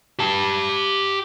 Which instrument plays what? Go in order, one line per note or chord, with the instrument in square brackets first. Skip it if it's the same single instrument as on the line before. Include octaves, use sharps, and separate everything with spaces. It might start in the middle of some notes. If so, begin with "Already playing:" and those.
[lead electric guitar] G4 A5